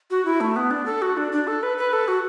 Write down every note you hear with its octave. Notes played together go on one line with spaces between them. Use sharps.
F#4
E4
A3
B3
D4
A4
F#4
D4
D4
A4
B4
B4
A4
F#4